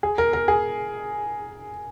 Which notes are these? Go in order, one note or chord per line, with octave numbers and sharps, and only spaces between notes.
G#4
A#4
A#4
G#4